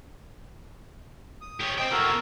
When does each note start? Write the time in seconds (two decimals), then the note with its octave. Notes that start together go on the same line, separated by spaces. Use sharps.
1.41 D#6
1.60 C#4 G4
1.78 C4 C5 D#5 G5
1.91 A#3 E4 F#4 A4 A#4